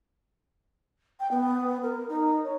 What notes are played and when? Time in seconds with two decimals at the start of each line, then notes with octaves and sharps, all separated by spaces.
1.20 G5
1.31 B3
1.82 A#4
2.09 D#4
2.44 C#5